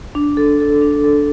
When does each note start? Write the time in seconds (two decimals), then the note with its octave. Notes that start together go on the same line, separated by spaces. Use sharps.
0.15 D4
0.37 A4
0.60 A4
0.82 D4
1.04 A4